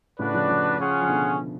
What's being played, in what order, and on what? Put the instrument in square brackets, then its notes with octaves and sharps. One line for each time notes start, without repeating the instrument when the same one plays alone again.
[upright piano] A2 C#3 [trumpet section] D4 F#4 B4 D5
[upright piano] C#3 F3
C#3 F3
[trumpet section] C#4 F4 G#4 C#5 F#5
[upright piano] F3
B2 D3